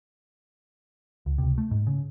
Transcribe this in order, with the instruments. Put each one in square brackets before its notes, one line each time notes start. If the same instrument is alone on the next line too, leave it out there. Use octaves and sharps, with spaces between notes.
[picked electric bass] C#2
C#2 C3
A3
G#2
C#3